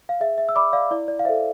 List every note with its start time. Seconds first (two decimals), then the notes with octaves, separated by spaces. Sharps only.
0.09 F5
0.20 G#4 E5
0.38 E5
0.49 E6
0.55 D5 B5 D6
0.73 D5 F5
0.91 E4 D5
1.08 D5
1.19 F5
1.25 A4 C5 E5